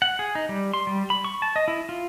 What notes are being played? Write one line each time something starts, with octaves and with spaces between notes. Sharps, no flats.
F#5
G#4
D#4
G3
C6
G3
B5
C#6
A5
D#5
E4
F4